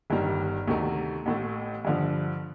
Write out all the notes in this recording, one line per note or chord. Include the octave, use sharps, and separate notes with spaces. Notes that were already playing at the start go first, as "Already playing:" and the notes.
G1 G2 D#3 G3 D4
D2 C3 D#3 A3
A1 A2 A3
G2 D3 F3